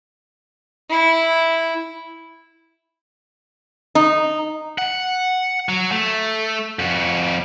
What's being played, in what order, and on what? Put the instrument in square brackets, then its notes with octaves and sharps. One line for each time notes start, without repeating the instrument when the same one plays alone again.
[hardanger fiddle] E4
[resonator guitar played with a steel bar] D#4
[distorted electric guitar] F#5
F#3
A3
F2 F#4